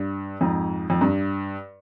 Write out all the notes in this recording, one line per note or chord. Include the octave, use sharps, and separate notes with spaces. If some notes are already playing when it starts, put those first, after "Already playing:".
Already playing: G2
F2 G#2
F2
G2